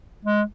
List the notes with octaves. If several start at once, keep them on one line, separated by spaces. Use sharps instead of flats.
G#3